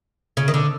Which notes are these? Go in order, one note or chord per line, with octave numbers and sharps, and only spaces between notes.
C#3
D#3
D3